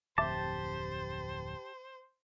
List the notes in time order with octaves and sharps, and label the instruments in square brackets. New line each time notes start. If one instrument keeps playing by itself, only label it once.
[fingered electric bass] D1 F2 [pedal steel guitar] G4 A5 [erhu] C5 [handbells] E5 D6